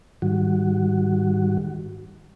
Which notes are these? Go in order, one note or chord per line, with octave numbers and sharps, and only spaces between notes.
G#2 D#3 G3 F#4